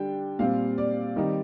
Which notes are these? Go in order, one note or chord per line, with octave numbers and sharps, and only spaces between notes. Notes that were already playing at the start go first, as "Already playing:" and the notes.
Already playing: D3 G3 D4 G5
A#2 G3 C4 F5
D5
D#3 G3 C4 D#4